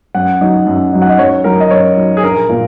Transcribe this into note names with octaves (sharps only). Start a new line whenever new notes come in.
F#2 F#5
F#3 D#4
F#2
F#3 D#4
F#5
D#5
F#2 C#5
F#3 D#4 A#4
D#5
F#2 C#5
F#3 D#4
G#4
A#1 A#4
A#2 A#3